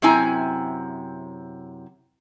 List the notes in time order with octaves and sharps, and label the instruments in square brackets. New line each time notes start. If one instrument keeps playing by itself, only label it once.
[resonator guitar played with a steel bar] F#2 C3 C4 E4 G#5 A#5